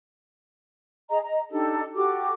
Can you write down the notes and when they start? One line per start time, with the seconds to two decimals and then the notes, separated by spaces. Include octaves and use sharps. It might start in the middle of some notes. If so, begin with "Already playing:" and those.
1.09 G#4 D#5 A#5
1.24 D#5 A#5
1.51 D4 D#4 G4 A4
1.94 F#4 G4 A4 D6